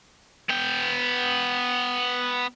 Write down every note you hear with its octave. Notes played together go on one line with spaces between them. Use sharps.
B3 G5